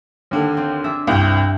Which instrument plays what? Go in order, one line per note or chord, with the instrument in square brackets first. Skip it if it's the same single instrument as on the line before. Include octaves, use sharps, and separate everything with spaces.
[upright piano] D#2 D3
[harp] C4
D4 G#4 E5
[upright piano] C2 [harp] G2 G5